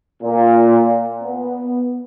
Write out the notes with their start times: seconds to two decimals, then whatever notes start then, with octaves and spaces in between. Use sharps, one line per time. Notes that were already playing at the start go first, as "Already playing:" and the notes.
0.23 A#2
1.22 B3